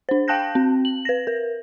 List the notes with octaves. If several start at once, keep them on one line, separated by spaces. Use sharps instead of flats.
D4 C5
F5 G5 A5 F#6 G6 A#6
C4
F#7
B4 A#6
A#4